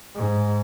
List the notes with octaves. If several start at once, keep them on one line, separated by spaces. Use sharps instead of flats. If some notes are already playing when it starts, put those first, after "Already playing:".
G#2